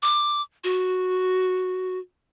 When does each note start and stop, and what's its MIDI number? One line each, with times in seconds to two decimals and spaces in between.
0.03 0.42 86
0.64 1.99 66